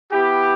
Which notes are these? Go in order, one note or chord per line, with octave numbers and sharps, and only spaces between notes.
B3 E4 G4